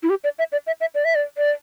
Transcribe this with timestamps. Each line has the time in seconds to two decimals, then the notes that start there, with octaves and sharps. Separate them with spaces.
0.03 E4
0.10 G4
0.24 D5
0.39 E5
0.52 D5
0.67 E5
0.81 E5
0.95 D5
1.05 E5
1.15 D5
1.37 D5